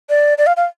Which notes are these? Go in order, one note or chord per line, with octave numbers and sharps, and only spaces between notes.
D5
D5
F5
F5